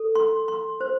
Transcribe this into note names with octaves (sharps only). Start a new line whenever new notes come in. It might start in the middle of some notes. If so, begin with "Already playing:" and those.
Already playing: A4
C6
C6
C5